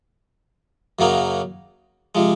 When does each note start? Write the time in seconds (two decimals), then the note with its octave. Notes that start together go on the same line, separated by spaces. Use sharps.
0.99 F#2 C#3 F#3 A#3 D#4
2.15 C3 F3 G#3